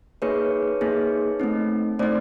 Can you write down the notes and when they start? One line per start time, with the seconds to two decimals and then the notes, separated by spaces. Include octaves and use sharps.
0.22 A#3 D#4 G#4 B4 C#5
0.81 A#3 D#4 G#4
1.40 A3 C4 D#4
1.99 A3 C4 D#4 C5 D5